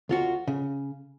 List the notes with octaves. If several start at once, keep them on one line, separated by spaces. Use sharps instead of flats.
D2 F4 F#4
C#3